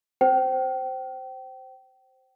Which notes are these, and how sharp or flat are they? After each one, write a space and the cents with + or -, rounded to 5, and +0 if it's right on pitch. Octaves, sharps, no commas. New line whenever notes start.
C5 +0 G5 -30